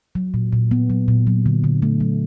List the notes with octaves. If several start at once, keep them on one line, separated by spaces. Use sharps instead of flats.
F#3
A#2
A#2
B3
F#3
A#2
F#3
D3
D3
A3
F#3